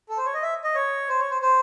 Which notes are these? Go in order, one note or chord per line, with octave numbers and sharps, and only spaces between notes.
A4
C5
C#5
D#5
E5
D#5
C#5
C5
C#5
C5
C5